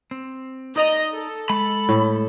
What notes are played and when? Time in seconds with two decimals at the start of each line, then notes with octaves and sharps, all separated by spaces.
0.11 C4
0.76 D#4 D5 D#5 A#5
1.13 A4
1.50 G#3 B5
1.89 A2